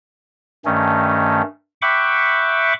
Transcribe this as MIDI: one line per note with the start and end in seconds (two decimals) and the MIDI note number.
0.65 1.42 43
0.65 1.42 51
0.65 1.42 57
0.65 1.42 61
1.82 2.73 76
1.82 2.73 78
1.82 2.73 79
1.82 2.73 83
1.82 2.73 85
1.82 2.73 86